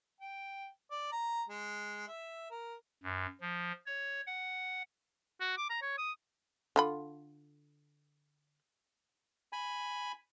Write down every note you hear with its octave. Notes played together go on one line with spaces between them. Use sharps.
G5
D5
A#5
G#3
E5
A#4
F#2
F3
C#5
F#5
F#4
D6
A#5
C#5
D#6
D3 F4 B5
G#5 B5